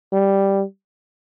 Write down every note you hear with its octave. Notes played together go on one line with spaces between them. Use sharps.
G3